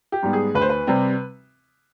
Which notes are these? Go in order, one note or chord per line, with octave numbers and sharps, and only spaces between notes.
G4
G#2 G3 B3
G#4
D2 B4
C5
B4
C3 G3 C4